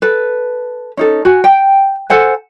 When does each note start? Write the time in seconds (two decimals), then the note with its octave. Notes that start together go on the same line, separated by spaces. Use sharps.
0.02 A4 B4
0.97 C#4 D#4 A4
1.25 F#4 G#5
1.44 G5
2.10 A4 C5 F#5 G#5